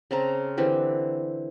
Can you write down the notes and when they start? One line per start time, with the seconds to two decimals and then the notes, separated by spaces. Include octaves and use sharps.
0.11 C#3 C4 A5 A#5
0.57 D3 E3 C4 G4